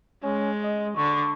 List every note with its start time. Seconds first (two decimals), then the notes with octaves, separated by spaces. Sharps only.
0.23 G#3 C#4
0.63 D#5
0.97 D3 D4 C#6